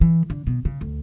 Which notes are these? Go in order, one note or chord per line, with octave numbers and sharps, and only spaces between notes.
E3
D3
B2
C#3
D2